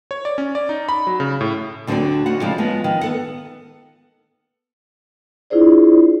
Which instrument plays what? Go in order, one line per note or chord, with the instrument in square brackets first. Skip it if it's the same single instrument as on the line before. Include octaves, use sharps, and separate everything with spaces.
[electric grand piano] C#5
D5
C#4
D5
D#4
B5
F#3
C#3
A2
[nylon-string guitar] D2 D3 F#3 C4 C5 D5
D2 D#4 F#4 F#5
C#3 F3 G#3 C4 F4 D5
F3 G#3 B3
D#3
B3 A4 F#5
[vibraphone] D4 E4 F4 G#4 C5 D5